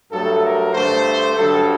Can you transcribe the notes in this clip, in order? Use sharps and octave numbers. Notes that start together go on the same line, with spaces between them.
G2 F#3 A3 A4
A#4
G2 D3 A3 C5
G2 D3 F#3 A4